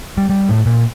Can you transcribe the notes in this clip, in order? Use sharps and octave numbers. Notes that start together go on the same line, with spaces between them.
G3
G3
A2
A#2